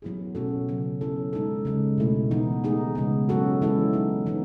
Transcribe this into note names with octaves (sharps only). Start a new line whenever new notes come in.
F#3 B3 E4 G#4
B2 A3 C#4 F#4 A4
C#3 F#3 B3
F#3 C#4 E4 A4
G#3 D#4 A4
C#3 G#3 C#4
B2 A3 E4
E3 B3 D#4
A3 D#4 G#4
C#3 G#3 B3
F#3 C#4 F#4 A4
E3 G#3 C#4 E4 A4
F#3 B3 D#4
E3 B3 D#4